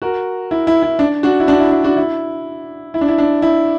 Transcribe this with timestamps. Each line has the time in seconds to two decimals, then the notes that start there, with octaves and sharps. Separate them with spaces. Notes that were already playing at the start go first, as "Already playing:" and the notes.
0.02 F#4 A#4
0.51 E4
0.67 E4
0.82 E4
0.99 D4
1.23 D4 F#4
1.40 E4
1.48 D4 F#4
1.60 E4
1.72 D4
1.84 D4 F#4
1.97 E4
2.94 E4
3.01 D4
3.08 E4
3.18 D4
3.42 E4